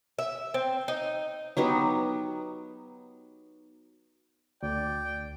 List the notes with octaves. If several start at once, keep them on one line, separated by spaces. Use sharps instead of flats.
E5
C4
D#4
F#3 B3 D#4 G4
D2 D5 G5